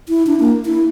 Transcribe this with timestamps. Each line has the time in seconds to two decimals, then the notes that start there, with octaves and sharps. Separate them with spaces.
0.09 E4
0.27 D4
0.40 A#3
0.65 E4